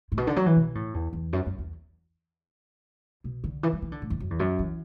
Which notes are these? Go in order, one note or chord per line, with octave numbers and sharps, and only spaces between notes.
A2
B2
D3
F#3
E3
B2
A2
E2
E2
F#2
F#2
E2
B2
D3
E3
F#3
E3
D3
A2
E2
F#2
E2
F#2
E3